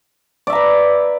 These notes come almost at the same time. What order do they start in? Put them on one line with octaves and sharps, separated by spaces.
D5 E5 A#5 B4